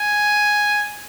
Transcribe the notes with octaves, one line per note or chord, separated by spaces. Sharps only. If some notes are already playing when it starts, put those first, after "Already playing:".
Already playing: G#5